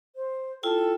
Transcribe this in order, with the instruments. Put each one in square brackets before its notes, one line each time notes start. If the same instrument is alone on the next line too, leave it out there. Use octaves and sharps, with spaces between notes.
[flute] C5
[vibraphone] E4 F4 G5 [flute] A4